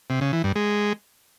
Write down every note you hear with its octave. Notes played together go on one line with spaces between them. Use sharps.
C3
C#3
E3
G2
G#3